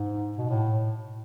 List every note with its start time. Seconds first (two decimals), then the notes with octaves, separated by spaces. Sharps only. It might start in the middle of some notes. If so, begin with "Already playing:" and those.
Already playing: G#2
0.38 B2
0.49 A2